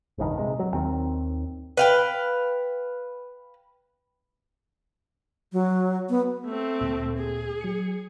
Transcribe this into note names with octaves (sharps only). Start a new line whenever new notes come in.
F1 A#1 G2 D#3
C3 G#3
F#3
D#2 D#3 C4
B4 F5 G5
F#3
B3
A3 C4
D2 A#2
G#4
F#3 C#7